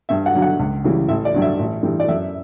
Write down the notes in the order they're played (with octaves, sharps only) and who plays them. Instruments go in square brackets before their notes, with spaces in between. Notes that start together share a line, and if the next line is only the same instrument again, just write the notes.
[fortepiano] G2 E5
F#5
D3 F#3
F#5
C#2
C#3 E3 G3
A1 E5
D5
G2 D3 F#3
E5
A1
G2 E3 G3
D5
F#2 E5